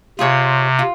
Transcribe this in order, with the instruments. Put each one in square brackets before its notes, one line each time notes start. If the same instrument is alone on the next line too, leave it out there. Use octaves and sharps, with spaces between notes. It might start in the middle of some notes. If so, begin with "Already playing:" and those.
[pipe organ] C3 [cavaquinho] F4 G#4 C#5 F#5
[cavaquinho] F4